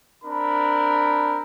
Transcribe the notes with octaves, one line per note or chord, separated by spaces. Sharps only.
C4 D4 A#4 B5